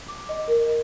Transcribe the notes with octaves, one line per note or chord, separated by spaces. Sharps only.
D6
D#5
A#4